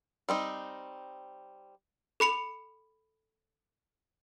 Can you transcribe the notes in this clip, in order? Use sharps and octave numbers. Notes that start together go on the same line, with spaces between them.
G3 C4 D#4
A4 B5 C#7 F7